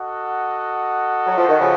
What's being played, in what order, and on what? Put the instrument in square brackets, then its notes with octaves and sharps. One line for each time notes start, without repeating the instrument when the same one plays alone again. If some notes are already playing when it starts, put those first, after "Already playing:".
Already playing: [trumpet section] F#4 A4 D#5 F#5
[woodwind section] F#3
F3
D#3
C#3 F3